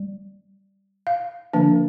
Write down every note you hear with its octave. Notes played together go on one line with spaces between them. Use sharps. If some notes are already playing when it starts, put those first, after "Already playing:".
Already playing: G3
F5
D3 F3 A#3 D4